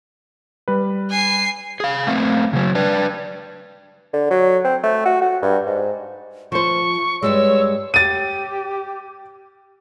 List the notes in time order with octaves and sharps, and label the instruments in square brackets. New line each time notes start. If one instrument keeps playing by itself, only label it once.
[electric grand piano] G3 B4
[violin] G#5 C7
[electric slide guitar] G#4 F5
A3 A#3 C4
C#3 F#3
D4 B4
[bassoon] D3
F#3
C4
A3
F#4
F#4
G2
G#2
[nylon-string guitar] F3 C5 [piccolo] C#6
[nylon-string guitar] G2 G3 G#3 [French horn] C#5 [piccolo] E6
[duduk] G4 [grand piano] A6 D#7